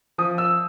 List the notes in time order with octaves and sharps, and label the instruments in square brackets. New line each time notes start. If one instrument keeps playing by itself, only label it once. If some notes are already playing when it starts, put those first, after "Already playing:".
[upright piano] F3 D#6
E6